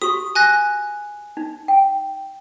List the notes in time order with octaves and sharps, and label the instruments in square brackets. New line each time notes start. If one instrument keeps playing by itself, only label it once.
[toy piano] F#4 G4 C#6 [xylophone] D#6
[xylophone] G#5 F#6 A#6
[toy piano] D#4
G5